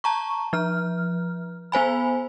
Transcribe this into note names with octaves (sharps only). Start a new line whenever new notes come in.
A5 A#5 C#6
F3 F6
B3 C5 G#5 B5